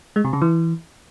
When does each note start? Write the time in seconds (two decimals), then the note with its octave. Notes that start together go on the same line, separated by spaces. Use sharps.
0.16 G#3
0.24 C3
0.33 C#3
0.42 E3